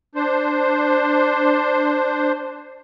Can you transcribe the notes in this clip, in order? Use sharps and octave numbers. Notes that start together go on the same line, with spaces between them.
D4 C5